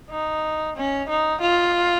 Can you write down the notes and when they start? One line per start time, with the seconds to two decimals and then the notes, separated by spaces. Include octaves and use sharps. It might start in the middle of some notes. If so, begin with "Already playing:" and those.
0.10 D#4
0.76 C#4
1.09 D#4
1.41 F4